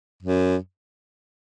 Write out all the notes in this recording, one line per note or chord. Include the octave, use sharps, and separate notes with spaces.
F#2